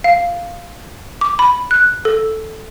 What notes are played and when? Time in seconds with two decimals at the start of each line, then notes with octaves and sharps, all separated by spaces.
0.04 F5
1.21 D6
1.39 B5
1.71 F#6
2.05 A4